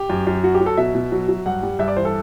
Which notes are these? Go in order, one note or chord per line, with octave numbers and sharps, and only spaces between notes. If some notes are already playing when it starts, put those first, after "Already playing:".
Already playing: G4
F#2
F#2
F#3 F#4
G4
F#3
A4
B2 E5
B2
F#3
F#3
G2 F#5
G3
G2 E5
D5
E3 C5
A4